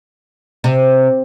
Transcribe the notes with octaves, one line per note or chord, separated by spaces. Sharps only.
C3